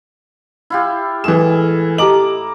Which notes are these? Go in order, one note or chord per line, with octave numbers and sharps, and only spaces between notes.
E4 F4 G4
A2 E3 G#3 E7
G4 D#5 A5 A#5 D6 F#7